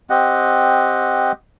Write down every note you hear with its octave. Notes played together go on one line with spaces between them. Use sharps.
C4 G4 D#5 F#5